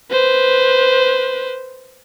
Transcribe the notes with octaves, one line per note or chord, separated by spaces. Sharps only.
B4 C5